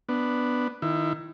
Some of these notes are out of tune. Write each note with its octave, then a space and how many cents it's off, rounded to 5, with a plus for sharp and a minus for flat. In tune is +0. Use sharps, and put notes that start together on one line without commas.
B3 +0 D4 +0
D#3 +0 E4 +25